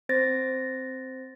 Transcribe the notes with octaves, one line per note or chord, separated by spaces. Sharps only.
C4 C5 A6 A#6